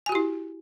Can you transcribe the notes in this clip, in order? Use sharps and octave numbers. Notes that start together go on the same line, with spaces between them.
E4 F#4 G4 G#5